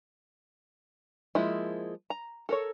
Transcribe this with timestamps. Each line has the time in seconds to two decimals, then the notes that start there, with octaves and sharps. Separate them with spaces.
1.35 F3 G#3 A#3 E4
2.10 A#5
2.49 A4 A#4 C#5